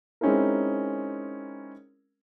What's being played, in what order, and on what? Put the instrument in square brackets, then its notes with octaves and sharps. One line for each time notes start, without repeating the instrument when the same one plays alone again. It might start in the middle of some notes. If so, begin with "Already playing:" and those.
[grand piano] G#3 C4 C#4 D#4 E4 A#4